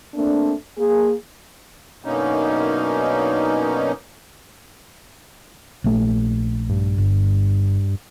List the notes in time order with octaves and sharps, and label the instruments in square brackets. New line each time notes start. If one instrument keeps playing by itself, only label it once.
[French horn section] A3 A#3 C4 D4
A#3 G#4
[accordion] F#2 B2 D3 A#3 C#4 D#4
[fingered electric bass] A#1 A3
[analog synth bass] G2
[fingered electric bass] G1